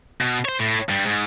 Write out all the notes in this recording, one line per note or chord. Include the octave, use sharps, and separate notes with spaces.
B2
C5 C#5
A2
G2 G3
G#2